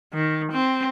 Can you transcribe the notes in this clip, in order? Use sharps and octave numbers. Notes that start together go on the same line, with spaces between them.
D#3
C4